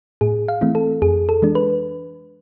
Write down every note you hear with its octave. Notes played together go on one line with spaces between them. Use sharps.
A2 G#4
F5
E3 A3 C4 E4
A4
F2 G#4
A4
E3 G#3 D4
B4